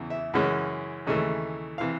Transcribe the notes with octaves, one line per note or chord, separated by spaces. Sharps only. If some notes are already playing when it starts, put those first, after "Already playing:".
Already playing: E2 C#3 E3
E5
F#2 C#3 E3 G#3 C#4
D#2 C#3 E3 A3
C3 E3 F5